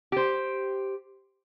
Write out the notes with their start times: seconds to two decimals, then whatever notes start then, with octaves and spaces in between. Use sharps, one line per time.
0.12 G4 C5